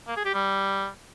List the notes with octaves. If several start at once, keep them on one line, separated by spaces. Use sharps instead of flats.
A#3
G#4
G4
G3